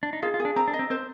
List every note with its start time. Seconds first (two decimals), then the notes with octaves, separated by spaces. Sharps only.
0.03 D4
0.13 D#4
0.22 F4 G#4
0.34 F4
0.40 G#4
0.45 D4
0.56 C4 A#5
0.68 D4
0.73 D#5
0.79 C4
0.90 C4 C5